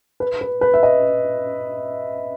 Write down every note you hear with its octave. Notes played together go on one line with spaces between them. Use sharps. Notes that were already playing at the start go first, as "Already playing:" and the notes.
B4
B4
B4
E5
D#5